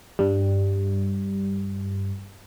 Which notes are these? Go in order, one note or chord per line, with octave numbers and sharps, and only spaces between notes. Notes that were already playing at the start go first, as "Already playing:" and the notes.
G2 G3